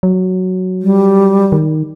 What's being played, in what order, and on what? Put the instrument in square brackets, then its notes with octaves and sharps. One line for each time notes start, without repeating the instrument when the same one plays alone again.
[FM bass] F#3
[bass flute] G3
[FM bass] D#3